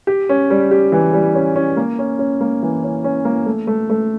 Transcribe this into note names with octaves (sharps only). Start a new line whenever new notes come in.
G4
C#4
G3
G4
E3
G3
C#4
C#4
A#3
C#4
C#4
A#3
E3
C#4
C#4
A#3
A3
A3
A3